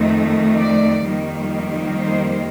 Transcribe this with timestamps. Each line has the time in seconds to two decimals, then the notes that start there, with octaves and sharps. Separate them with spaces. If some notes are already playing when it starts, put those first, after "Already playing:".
Already playing: F2 D#3 A3
0.59 D5
1.06 F2 D#3 G3 A#3
1.99 C5